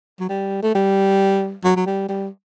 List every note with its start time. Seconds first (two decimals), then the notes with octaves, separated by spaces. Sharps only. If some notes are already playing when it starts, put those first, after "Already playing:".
0.20 F#3
0.29 G3
0.63 A3
0.75 G3
1.64 F#3
1.76 F#3
1.86 G3
2.08 G3